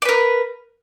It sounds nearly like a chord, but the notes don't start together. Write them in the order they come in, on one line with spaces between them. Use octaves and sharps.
D5 B4 A#4